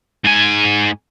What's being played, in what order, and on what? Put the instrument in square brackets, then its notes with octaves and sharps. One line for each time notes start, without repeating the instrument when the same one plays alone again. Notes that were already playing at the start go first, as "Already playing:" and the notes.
[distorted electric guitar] G#2 G#5